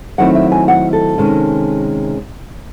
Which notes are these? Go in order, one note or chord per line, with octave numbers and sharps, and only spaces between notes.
D#3 F#3 A3 C4 E4 F#5
E5
G#5
F#5
A4
C3 D#3 G#3 C#4